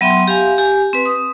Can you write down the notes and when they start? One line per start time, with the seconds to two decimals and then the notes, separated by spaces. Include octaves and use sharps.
0.01 F#3 B3 E5 G5 C6
0.28 G4 F5 G#5
0.58 G4 G#5
0.93 C4 B4
1.06 D#6